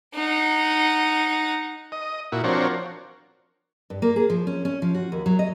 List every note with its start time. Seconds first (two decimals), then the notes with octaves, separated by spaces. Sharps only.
0.15 D#4 F#5
1.92 D#5
2.32 A#2 E4 F#4
2.44 F3 C4 D4 F#4 A#4 C#5
3.90 G2
4.02 A#3
4.16 G#4
4.30 F3
4.47 C#4
4.65 C#4
4.82 F3
4.94 F#4
5.12 D#2
5.26 F#3
5.39 D#5